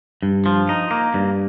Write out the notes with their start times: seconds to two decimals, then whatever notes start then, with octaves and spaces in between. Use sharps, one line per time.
0.23 G2
0.46 F3
0.69 D#4
0.91 A#3
1.14 G2